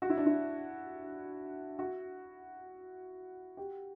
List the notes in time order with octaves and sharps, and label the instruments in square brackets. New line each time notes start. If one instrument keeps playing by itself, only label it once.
[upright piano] F#4
E4
D4
E4
F#4
G4